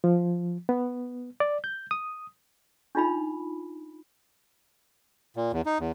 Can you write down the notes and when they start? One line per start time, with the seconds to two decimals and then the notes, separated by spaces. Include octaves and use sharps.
0.04 F3
0.69 B3
1.40 D5
1.64 G6
1.91 D#6
2.95 D4 D#4 F4 B5
5.36 A#2
5.53 E2
5.66 D#4
5.80 E2